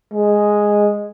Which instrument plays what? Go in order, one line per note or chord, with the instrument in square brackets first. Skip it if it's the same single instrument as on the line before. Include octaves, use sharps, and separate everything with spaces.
[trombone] G#3